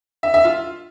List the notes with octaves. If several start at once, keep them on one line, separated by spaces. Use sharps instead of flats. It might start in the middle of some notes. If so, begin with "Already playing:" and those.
E5
E5
F4